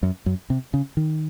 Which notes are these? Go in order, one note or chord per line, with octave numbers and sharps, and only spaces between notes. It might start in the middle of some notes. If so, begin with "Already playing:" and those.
F#2
F#2
C3
C#3
D#3